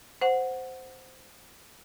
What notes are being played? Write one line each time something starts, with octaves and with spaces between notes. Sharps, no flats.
C5 F#5